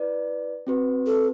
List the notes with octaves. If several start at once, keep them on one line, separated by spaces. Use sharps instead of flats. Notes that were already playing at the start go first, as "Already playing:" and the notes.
Already playing: E4 B4 D5
C4 F#4 B4
A4